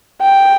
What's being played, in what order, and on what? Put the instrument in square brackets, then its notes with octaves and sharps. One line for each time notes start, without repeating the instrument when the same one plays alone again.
[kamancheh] G5